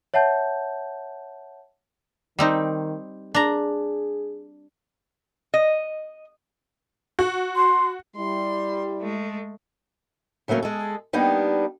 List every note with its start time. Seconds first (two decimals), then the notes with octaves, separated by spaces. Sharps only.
0.14 C#5 E5 F#5 A5 G6
2.39 D#3 G3 C4 D#4
3.35 D4 G#4 A#5
5.54 D#5
7.19 F#4
7.56 C6
8.16 G3 E4 C6
9.00 G#3 A3
10.48 C#3 F#3 A3 A#3 C#4
10.62 G#3 G#4 A4
11.13 G3 A#3 B3 D4 D#4 G4